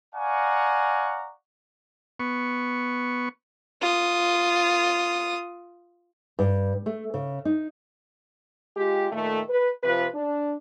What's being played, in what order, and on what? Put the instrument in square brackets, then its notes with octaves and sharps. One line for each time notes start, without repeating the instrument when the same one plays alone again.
[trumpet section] D5 F5 F#5 G#5 A#5 C#6
[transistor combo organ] B3 C#6
[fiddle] F4 D#6
[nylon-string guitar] G2
A3
C#3
D#4
[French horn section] G#3 F4 G4
A#2 D#3 A3
B4
C3 F3 F4 B4
D4